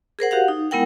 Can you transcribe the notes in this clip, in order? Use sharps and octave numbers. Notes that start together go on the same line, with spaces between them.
G#4 A#4 C5 F#5
F#4 G4 F5 F#5
D#4
G#3 B3 E4 A#4 F#5 G5